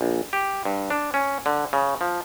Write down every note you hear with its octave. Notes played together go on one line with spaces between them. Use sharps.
A#1
G4
G2
D4
C#4
D3
C#3
F3